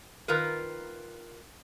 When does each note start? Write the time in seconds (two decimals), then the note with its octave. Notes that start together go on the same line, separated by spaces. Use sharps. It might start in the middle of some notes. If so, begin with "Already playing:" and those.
0.28 D#3 F4 A#4 B4